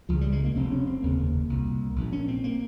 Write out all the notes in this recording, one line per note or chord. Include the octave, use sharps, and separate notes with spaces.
C#2 C#3 F3
G3
G#3
A#3
F1 F2 C3 C4
C#4
C4
F1 D#2 C#3 A#3
C2 A#2
A#1 A#2
C#4
C4
A#3